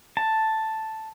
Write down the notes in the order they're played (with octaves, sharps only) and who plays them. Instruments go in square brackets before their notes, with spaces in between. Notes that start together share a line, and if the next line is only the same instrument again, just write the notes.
[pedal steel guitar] A5